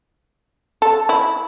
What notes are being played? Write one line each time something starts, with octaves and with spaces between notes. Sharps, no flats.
A4
E4